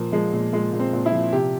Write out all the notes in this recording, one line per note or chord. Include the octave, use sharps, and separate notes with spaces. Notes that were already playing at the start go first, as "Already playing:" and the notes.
Already playing: A#2 F3 A#3
F3 G#3
A#2
A#2 G#3
A#2
C4
A#2
E4
F3
C3 G4